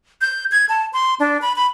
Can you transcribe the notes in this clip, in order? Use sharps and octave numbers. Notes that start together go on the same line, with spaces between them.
G6
G#6
A5
C6
D4
B5
B5